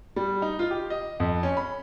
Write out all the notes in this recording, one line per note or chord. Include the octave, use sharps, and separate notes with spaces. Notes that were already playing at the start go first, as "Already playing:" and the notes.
G3
D#4
F4
G4
D#5
F2
C#4
B5